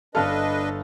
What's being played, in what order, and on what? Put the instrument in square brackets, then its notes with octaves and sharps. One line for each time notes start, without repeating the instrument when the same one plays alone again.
[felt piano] G1 F5 F6 [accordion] D4 B4 D#5 [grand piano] A4 A5